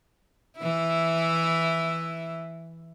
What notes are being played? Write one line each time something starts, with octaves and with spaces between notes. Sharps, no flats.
E3 E4